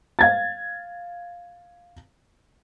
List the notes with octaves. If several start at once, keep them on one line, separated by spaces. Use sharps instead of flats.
F5 G#6 A6